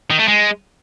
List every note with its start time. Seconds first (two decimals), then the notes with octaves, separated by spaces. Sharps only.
0.11 D#3
0.19 A3
0.28 G#3